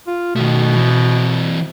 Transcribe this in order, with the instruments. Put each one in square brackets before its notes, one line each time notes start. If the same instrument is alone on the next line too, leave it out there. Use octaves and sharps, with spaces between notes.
[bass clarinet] F4
[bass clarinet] B2 [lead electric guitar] D#3 A3
[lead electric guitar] E3 C4